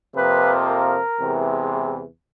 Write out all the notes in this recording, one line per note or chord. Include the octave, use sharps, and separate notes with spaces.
F2 C3 F3 A#3 B4
A#4
E2 C3 E3 G#3